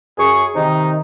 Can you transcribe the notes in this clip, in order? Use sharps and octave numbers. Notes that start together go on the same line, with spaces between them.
F#2 G#4 C#6
C3 D#3 D#4